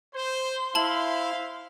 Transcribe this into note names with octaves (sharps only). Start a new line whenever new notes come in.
C5 C6
E4 C5 E5 F5 A5 F#7